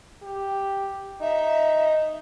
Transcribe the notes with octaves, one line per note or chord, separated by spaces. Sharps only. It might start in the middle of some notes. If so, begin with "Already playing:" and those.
G4
D#4 E5